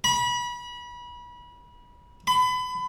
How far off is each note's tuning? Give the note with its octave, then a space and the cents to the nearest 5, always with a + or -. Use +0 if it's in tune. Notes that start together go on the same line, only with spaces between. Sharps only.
B5 -30
B5 +30